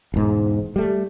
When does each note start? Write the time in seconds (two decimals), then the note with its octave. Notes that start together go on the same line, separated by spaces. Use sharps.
0.14 E1 G#2
0.76 G3 A3